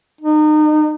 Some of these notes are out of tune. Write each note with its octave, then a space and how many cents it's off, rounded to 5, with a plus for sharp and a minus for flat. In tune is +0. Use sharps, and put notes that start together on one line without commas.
D#4 -30